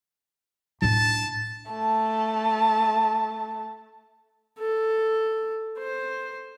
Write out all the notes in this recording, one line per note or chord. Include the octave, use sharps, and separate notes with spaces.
A2 D4 A5
A3 A5
A4
C5